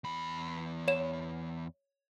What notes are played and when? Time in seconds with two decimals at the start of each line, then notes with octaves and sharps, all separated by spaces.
0.04 E2 B5
0.88 C#5 E7